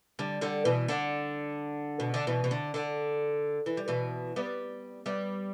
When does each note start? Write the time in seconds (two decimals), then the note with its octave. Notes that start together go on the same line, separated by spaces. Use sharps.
0.19 D3 G3
0.41 D3 G3
0.65 B2 E3
0.88 D3
2.00 B2
2.14 D3
2.27 B2 E3
2.44 B2
2.51 D3
2.74 D3
3.66 E3
3.77 G3
3.88 B2 E3
4.36 G3 B3
5.06 G3 B3